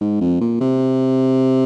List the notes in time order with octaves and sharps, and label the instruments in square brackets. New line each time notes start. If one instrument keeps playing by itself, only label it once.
[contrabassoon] G#2
F2
A#2
C3